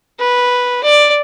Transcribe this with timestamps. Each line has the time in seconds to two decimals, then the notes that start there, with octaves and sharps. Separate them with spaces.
0.19 B4
0.83 D5